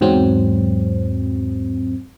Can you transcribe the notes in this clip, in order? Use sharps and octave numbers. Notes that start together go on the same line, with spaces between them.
E2 G#2 F#3 C4